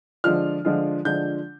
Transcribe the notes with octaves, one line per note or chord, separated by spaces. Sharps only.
D3 F3 G#3 D4 F4 F6
D3 F3 G#3 D4 F4
D3 F3 G#3 D4 F4 G6